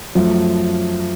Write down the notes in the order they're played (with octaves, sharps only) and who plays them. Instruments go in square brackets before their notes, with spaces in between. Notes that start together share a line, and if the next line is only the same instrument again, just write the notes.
[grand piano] F#2 F3 A3